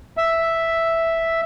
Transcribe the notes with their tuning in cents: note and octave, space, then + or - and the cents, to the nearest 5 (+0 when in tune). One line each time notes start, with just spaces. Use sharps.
E5 +0